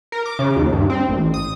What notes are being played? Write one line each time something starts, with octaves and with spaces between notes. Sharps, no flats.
A#4
D6
C#3
D#2
G2
C4
A1
D#6